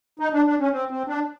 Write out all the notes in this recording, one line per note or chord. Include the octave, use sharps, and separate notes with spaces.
D#4
D4
D4
C#4
C4
C4
D4